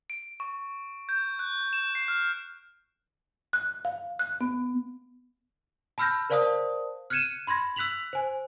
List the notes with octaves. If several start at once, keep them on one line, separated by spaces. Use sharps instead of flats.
D7
C#6
G6
F#6
E7
C7
F6
F#6
F5
F#6
B3
A5 B5 E6 F6 G6 A#6
A#4 C5 D5 F5 A5 D#6
F6 F#6 G#6 C#7 D#7 E7
B5 C6 G#6 A#6
E6 F#6 B6 F7 F#7
C5 G#5